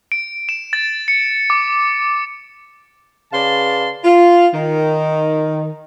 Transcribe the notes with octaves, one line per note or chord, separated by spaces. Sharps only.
D7
E7
A6
C#7
D6
C#3 B4 D5 F5 A5 C6
F4
D#3